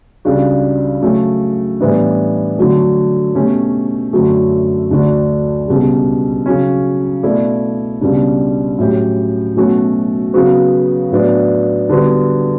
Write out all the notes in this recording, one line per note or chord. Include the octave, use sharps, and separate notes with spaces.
C#2 C#3 G3 D4 F#4
C#3 F#3 A3 C#4
A2 E3 G3 B3 D4
D3 F#3 A3
B2 A3 C#4 G4
F#2 D3 F#3 A3
D2 D3 A3 D4 F#4
C#2 B2 G3
C#3 F#3 C#4
B2 A3 E4 A4 D5
C#2 B2 G3 D4
A2 F#3 C#4 G4
B2 F#3 A3 C#4 F#4
C#3 F#3 B3 F#4 B4
A2 F#3 B3 D4
D3 G3 B3 F#4